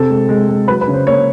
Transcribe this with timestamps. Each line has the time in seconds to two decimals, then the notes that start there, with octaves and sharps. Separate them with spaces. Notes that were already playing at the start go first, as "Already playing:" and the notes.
Already playing: C3 C4 A4
0.10 G#3
0.29 G#3
0.49 G#3
0.68 F#3 B4
0.81 B4
0.88 C#3
0.94 C5
1.07 A#3 C#5